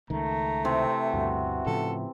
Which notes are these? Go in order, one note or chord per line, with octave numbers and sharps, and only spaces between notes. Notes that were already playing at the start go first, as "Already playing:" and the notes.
C#2 D#3 A3 A#5
C3 E3 C4 C5
D2 G2 B2 F#4
A2 C#3 F3 A4